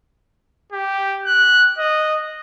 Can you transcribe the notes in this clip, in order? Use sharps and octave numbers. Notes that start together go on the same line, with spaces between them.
G4
F#6
D#5